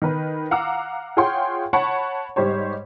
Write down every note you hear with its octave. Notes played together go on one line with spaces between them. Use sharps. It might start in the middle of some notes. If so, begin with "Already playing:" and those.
D#3 B4
F5 F#5 A#5 D6 E6
F4 G#4 C#5 F#5 G5 C6
C#5 F#5 A5 B5 C#6
G#2 G3 G4 C5 C#5